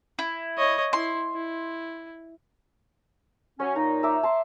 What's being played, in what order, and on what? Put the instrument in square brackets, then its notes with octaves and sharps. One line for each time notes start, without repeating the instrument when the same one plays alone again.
[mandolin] E4
[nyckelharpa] C#5 D#5
[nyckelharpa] E4 [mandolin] C6
[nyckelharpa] E4
[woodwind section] F#3 C#4 [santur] C#5
[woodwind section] A#2 D#4 [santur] A#5
[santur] E5 A#5 D6
A5 C6